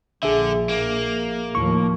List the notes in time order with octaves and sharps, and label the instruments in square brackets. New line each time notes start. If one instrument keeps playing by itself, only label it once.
[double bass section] A#1 [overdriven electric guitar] D3 [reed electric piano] G#4 E5
[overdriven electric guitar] A#3
[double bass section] D#2 A2 F3 [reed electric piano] C#6